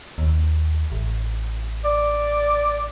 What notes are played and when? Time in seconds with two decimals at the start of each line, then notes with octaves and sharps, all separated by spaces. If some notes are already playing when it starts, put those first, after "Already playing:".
0.18 D#2
0.92 A1
1.85 D5